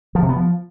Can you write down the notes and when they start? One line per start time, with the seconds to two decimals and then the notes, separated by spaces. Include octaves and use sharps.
0.15 F3
0.22 C3
0.29 B3
0.36 F3